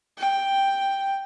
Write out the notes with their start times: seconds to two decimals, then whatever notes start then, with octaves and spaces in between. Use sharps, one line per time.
0.18 G5